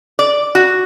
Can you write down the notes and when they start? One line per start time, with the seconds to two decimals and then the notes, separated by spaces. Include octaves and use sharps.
0.19 D5
0.55 F#4